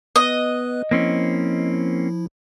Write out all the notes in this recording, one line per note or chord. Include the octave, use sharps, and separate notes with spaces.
B3 B4 D#5 F#6
F3 A#3 C4 C#4 E4